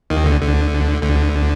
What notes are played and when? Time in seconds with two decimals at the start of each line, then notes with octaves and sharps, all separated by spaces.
0.10 D#2 D#3
0.26 D2 D3
0.41 D2 D3
1.02 D2 D3